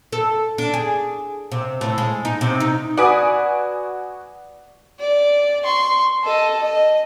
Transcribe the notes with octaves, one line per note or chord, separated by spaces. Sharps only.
A4
D4
G#4
C3
A2
G#3
D#4
C3
D#4
F#4 B4 D5 G#5 D#6
D5
C6 C#6
A4 D#5
D#5